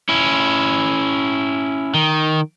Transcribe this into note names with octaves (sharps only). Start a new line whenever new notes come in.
C#4 E4
D#3